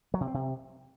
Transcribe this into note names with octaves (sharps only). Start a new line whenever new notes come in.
F#3
C3
C4
C3